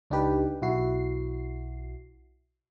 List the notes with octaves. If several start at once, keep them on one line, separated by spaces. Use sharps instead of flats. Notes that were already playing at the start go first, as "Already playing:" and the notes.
C#2 D4 D#4 G4 B4
B1 E4 F#4 C7